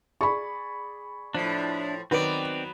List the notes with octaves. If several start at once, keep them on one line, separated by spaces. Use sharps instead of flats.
G#4 D5 B5 C#6
A2 F3 D4 E4
D#3 F#3 B3 C4 B4 D5